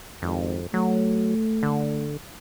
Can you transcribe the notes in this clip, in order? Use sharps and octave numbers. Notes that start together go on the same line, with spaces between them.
G#1 F2
F#3 A3
D3